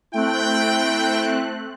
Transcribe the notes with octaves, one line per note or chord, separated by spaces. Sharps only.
A3 C4 E4 G5 F#6